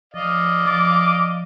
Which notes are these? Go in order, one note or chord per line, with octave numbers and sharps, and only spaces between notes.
F3 D5 D#5 F5
F3 D6 A6